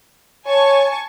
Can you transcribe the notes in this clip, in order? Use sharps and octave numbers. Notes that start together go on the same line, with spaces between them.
C#5 G#5 A5 C#6